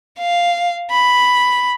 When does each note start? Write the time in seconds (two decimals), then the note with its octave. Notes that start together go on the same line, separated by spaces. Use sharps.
0.19 F5
0.91 B5